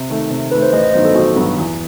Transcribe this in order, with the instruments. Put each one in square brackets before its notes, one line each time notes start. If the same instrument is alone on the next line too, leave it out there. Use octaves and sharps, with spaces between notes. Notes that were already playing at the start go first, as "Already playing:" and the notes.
Already playing: [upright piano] C3
D#3 A3
C3
[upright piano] D#3 A3 [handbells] B4
[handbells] C5
[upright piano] A1 [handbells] D#5
[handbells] D#5
[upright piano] G2 D#3 F#3 B3 [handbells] C5
[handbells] A4
[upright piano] A1 [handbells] F#4
[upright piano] G2 D#3 F#3 B3
E2